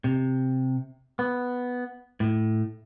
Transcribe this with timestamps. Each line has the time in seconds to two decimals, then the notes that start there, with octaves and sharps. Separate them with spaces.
0.04 C3
1.19 B3
2.20 A2